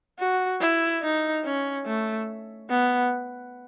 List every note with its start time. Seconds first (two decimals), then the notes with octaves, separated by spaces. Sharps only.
0.19 F#4
0.61 E4
1.03 D#4
1.45 C#4
1.86 A3
2.70 B3